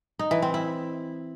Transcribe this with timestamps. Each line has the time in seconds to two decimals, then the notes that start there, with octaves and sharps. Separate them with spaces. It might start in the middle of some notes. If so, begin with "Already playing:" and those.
0.19 D#4
0.31 E3
0.42 C4
0.54 E4